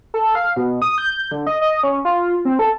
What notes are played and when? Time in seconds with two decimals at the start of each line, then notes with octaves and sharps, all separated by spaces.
0.14 A4
0.35 F5
0.56 B2
0.82 D#6
0.98 G6
1.31 D3
1.47 D#5
1.61 D#5
1.83 C#4
2.05 F4
2.45 C4
2.59 A4